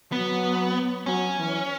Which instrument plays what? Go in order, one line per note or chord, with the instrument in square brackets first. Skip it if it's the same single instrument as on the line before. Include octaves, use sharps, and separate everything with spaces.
[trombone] F#3 [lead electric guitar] B3
[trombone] F#3 [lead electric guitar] C#4
[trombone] E3